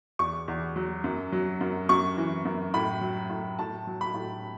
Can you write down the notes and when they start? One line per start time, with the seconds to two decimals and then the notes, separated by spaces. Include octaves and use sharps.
0.19 E2 C#6
0.48 E2
0.76 F#3
1.04 F#2
1.32 F#3
1.61 F#2
1.89 F#2 C#6
2.17 E3
2.45 F#2
2.74 A2 B5
3.01 F#3
3.29 A2
3.59 A2 A5
3.87 F#3
4.01 B5
4.14 A2